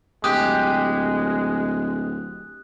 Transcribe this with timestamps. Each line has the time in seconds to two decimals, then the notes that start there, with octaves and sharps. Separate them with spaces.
0.24 D1 G#3 G4 D#6 F#6